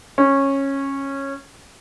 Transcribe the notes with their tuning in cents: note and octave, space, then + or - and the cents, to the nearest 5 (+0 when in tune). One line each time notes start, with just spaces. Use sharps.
C#4 -15